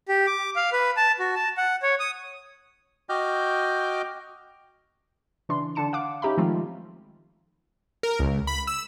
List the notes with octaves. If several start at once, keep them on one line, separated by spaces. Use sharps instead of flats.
G4
D6
F5
B4
A5
F#4
A5
F#5
C#5
D#6
F#4 D#5 G5 D6 F6 G6
C#3 E3 D4 C6
D3 D4 A5 C#7 E7
F5 F#5 D6
C#4 D#4 G4 E5 A#5 B5
D#3 F3 G#3 A3 C4 F4
A#4
C#2
B5
E6